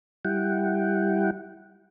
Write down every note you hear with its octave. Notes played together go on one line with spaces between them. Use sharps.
G3 E4 F#5 G5